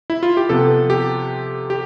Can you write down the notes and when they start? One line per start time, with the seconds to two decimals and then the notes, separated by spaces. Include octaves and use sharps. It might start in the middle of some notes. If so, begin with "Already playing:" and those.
0.10 E4
0.23 F4
0.37 G4
0.49 C3 F3 B3 A4
0.90 G4
1.70 G4